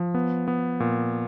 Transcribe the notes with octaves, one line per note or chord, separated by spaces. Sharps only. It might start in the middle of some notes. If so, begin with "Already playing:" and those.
Already playing: F3
B3
B3
A#2